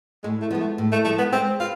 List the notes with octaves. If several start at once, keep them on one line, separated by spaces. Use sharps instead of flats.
A2 G#3
A3
F3 G#3 B3
A3
A2
A3
F3 G#3 A3
B3
G#3 C4
F4 B4